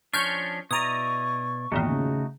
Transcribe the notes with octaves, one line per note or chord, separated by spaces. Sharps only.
F3 C#4 D4 C#6 F6 G6
B2 E4 D5 A#5 C#6 D#6
G#1 E2 A#2 A3 D#4 F#4 G5
C#3